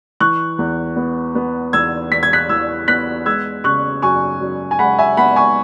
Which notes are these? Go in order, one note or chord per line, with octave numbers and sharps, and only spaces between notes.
E3 C#6 F#6
E2
B3
B3
E2 E6 G#6
E2 B6
G#6
F#6 B6
E3 E6 G#6
B3 F#6 B6
G#3 E6 G#6
C#3 C#6 F#6
F#2 G#5 C#6
F#2
G#5
G#3 F#5 B5
E5 G#5
B3 F#5 B5
G#5 C#6